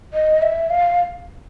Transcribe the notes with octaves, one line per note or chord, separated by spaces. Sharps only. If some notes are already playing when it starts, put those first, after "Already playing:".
D#5
E5
F5